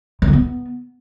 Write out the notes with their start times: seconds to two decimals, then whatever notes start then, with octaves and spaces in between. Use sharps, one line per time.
0.22 D#3
0.27 D3
0.33 B3